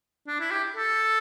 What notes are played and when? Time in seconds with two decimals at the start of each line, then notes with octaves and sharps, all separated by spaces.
0.27 D4
0.40 E4
0.51 G4
0.76 A4